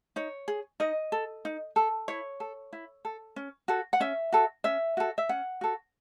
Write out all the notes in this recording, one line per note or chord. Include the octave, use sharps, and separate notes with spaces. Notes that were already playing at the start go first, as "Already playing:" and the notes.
D#4 C#5
G#4
D#4 D#5
A4
D#4
A4
E4 C#5
A4
E4
A4
C#4
F#4 A4
F#5
C#4 E5
F#4 A4
C#4 E5
F#4 A4
E5
C#4 F#5
F#4 A4